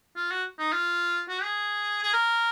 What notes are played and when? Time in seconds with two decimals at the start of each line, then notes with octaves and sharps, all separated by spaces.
0.16 F4
0.31 F#4
0.58 D#4
0.72 F4
1.29 F#4
1.43 G#4
2.03 G#4
2.13 A#4